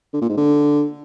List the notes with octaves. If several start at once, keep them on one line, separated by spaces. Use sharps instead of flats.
D3
A#2
G#2
D3